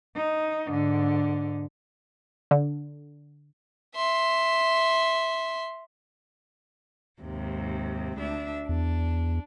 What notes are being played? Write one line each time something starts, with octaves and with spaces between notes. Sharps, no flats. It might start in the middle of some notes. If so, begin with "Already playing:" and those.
D#4
G#2 D3
D3
E5 C6
D#2 G#2 C3
D2 D4 E5
E2 D4